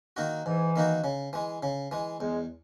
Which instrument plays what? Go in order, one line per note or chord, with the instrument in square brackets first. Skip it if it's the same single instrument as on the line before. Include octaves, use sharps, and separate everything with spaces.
[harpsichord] D#3 A#3 D#4 F#4
[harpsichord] G#2 [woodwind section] E3
[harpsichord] D#3 A#3 D#4 F#4
C#3
E3 G#3
C#3
E3 G#3
[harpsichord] E2 [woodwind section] G#3